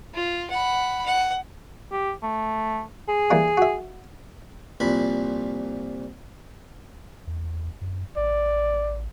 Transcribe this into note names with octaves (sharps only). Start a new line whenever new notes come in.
F4
F#5 B5
F#5
G4
A3
G#4
E3 G3 A#3
F#4 E5
C2 A#2 F3 B5
E2
F#2
A1 D5